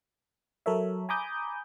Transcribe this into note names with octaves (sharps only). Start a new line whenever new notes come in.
F#3 A4 A#4 C#5 E5
G#5 A#5 B5 D6 D#6 G6